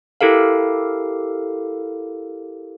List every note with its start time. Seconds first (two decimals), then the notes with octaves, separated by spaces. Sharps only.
0.21 E4 G4 A4 A#4 F5